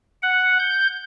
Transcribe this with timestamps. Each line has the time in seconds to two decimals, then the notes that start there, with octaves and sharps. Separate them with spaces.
0.22 F#5
0.59 G6